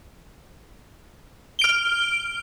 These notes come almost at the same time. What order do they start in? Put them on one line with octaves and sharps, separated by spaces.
G7 D7 F6